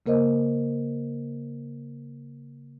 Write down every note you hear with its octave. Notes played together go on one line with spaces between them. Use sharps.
C#3 A#3 A#4 C5 D#5